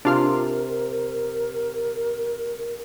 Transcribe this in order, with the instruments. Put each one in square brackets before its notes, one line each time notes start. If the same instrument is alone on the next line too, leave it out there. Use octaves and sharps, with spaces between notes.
[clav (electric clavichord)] C3 [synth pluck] D4 F4 F6 [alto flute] A#4